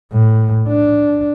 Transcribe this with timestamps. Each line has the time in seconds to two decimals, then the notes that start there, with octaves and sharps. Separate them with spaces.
0.13 A2
0.69 D4